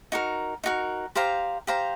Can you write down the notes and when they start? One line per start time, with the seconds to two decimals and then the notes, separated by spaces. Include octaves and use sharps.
0.12 D#4 F#4 A#4
0.64 D#4 F#4 A#4
1.16 G4 C5 F5 A#5
1.67 G4 C5 F5 A#5